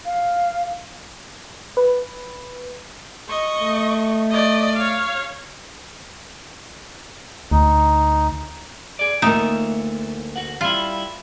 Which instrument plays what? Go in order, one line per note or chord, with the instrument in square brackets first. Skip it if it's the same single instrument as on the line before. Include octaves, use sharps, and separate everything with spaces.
[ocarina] F5
[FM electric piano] B4
[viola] D#5 C#6
[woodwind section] A3
[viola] D5 D#5
C#5 F5
[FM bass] D2 [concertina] D#4
[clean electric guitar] G#4 D5
[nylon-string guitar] D2 A#3 [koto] D#4 [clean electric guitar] F4 C#5 E5
[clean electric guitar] F#4 F#5
[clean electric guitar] G3 E4 [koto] F4